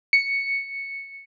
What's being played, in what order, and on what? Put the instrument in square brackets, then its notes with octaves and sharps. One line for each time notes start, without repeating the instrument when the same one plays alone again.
[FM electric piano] C#7